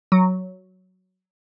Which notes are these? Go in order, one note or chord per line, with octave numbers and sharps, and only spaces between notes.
F#3